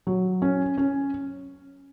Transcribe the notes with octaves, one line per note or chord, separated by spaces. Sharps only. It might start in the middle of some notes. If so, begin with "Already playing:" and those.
F#3
C#4
C#4